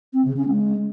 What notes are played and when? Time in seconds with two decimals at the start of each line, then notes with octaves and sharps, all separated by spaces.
0.13 C4
0.25 C#3
0.37 C#4
0.49 G#3